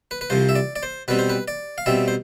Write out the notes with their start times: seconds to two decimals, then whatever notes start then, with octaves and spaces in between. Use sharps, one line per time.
0.11 B4
0.21 B4
0.30 C2 C3 F3 C5
0.49 E5
0.55 D5
0.76 D5
0.83 C5
1.08 B2 G3 C4 B4
1.19 C5
1.30 B4
1.48 D5
1.78 F5
1.86 B2 G3 C4 E5
2.08 C5